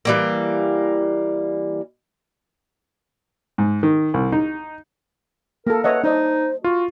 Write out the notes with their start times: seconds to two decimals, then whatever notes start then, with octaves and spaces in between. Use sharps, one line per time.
0.05 E3 G3 A#3
3.58 G#2
3.83 D#3
4.14 C2
4.32 D#4
5.67 A#3 A4 A#4
5.84 B4 C#5 D#5 E5 F#5
6.04 D4 D#4 C5 D#5
6.64 F4 F#4